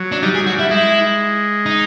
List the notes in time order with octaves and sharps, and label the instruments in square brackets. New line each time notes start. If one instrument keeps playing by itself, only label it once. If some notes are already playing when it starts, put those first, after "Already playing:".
Already playing: [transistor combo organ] F#3
[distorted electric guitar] D4
[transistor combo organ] G3 [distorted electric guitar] D#4
[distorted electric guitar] G#4
[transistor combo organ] F#3
[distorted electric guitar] F#4
[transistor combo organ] G3 [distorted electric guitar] E4
[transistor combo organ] G#3 [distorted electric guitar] E4
[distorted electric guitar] D#4